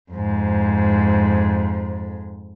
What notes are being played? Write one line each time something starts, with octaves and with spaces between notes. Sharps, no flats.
F2 G#2